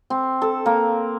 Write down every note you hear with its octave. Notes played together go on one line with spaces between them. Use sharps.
C4
A4
A#3